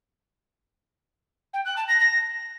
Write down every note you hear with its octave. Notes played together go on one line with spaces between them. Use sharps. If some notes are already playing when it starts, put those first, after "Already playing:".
G5
F#6
A5
A#6
A#6